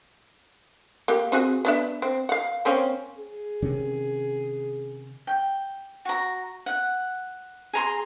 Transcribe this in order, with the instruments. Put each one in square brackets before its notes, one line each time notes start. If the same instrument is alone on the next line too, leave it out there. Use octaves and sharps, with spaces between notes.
[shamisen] A#3 G4
C4 F#4 G#4
B3 D4 E5
C4
F5 F#5
A#3 C4 C#4
[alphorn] G#4
[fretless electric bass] C3 D#3 C#4
[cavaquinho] G5
F#4 A#5
F#5
G#4 A#5 C6